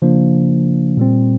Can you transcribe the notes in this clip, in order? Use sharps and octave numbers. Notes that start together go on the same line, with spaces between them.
C#3 F3 A#3 D4
A#2 G3 C4